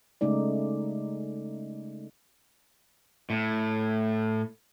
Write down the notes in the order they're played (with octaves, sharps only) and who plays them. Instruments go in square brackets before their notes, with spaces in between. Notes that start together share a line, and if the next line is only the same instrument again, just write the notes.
[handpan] C#3 G#3 A3 D#4 D5
[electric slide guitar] A2